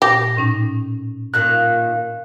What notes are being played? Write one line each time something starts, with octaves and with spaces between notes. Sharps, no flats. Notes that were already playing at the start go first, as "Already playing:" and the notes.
A#2 G4 A#6
A2 C#4 D#4
A#2 D#3 A#3 F#6